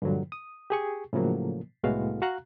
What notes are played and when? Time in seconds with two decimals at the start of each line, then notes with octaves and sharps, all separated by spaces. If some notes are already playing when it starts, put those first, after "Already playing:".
0.02 G2 A#2 D3 F3 F#3
0.32 D#6
0.70 G4 G#4 C#6
1.13 A2 C#3 F3 F#3 A#3
1.83 C2 A2 G#3 B3 F#4 F5
2.22 F#4 F5 A#5 F#6